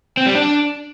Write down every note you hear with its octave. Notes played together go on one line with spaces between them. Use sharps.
C4
G3
D4